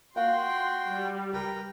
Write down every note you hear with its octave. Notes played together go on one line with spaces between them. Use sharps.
A#3 F4 F#4 G5 C6
G3
C#2 G4 A#4 B4 G5